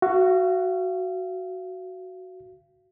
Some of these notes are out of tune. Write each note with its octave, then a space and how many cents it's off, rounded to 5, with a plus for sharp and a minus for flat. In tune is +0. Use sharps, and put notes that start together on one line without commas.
F#4 +5 F5 -40